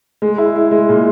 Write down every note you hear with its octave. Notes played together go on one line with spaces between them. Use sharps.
G#3
E4
E4
G#3
A#2